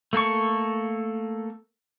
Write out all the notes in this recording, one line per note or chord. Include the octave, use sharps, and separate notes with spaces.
A3 A#3 A4 C#6